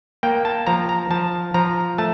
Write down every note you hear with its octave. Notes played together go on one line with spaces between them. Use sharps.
A#3 G5
A5
F3 A#5
A#5
F3 A5
F3 A#5
A3 A5